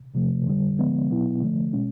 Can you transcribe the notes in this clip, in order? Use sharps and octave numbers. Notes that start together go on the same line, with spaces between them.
E2 C3 F3 A3
F2 D3 G3
D3 F3 G#3 B3
B2 F#3 B3 E4
D3 F3 A3
B2 G#3 C#4